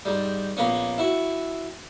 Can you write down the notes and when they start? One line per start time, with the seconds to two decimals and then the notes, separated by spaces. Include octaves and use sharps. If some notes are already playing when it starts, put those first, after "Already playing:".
0.05 G#2 G3
0.57 A#1 A#3 B3 C#4
0.98 E4 F#4